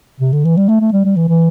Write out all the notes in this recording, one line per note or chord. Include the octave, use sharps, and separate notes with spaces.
C3
D3
E3
G3
A3
A3
G3
G3
E3
E3